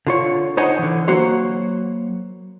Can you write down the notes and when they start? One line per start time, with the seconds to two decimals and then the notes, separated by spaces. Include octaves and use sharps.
0.07 D3 F4 C#5
0.57 D#4 C5 C#5 D#5 F#5 G#5
0.79 D3 E3
1.08 F#3 A#3 F#4 C5 C#5